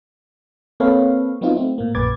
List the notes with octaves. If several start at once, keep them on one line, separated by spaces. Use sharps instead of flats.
A#3 C4 A4 B4 C#5 F5
F#3 B3 C4 D#4 F4 F#4
A3 C4 E4
A2 A#3
A#1 F#2 B4 D6 G#6 A6